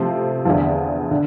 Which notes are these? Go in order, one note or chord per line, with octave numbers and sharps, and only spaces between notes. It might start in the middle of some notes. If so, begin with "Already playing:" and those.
Already playing: C3 F3 A3 C4 F4
E2 D3 F3
D3